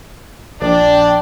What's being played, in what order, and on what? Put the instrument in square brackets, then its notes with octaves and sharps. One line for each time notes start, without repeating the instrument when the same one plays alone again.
[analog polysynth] A#1 [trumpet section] D4 [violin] D5 G5